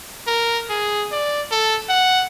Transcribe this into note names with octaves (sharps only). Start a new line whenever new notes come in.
A#4
G#4
D5
A4
F#5